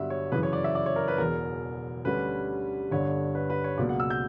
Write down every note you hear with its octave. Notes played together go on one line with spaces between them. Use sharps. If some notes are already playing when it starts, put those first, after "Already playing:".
Already playing: G1 G2 D3 F#3 B3 E5 F#5
C#5
F#2 C#3 E3 B4
C#5
D5
E5
D5
C#5
A#4
B4
E1 E2 B2 A#4
D2 D3 G3 C#4 B4
G1 G2 D3 C#5
B4
B4
C#5
C#2 B2 F#3 A#3 D5
F#5
E6
G6